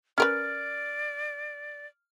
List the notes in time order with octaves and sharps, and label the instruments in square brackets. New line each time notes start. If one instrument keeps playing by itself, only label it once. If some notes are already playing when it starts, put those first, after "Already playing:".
[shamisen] C#4 A#4 B4 [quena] D5 [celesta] F6